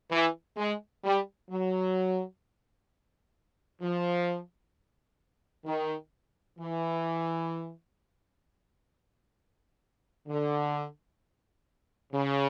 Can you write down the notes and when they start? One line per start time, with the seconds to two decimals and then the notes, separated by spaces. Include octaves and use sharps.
0.11 E3
0.57 G#3
1.04 G3
1.51 F#3
3.82 F3
5.66 D#3
6.59 E3
10.28 D3
12.13 C#3